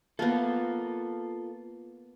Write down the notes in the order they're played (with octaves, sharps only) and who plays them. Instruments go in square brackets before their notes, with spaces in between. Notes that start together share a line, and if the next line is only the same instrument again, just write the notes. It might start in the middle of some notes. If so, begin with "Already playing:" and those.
[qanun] A#3 B3 [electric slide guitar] F4 A4